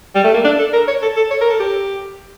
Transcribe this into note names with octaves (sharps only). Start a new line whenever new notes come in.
G3
A3
A#3
D4
A4
A#4
C#5
A4
A4
C#5
A#4
A4
G4